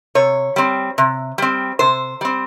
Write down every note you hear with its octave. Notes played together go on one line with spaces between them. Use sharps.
C3 C#5
G3 C4
C3
G3 C4
C3 C5
G3 C4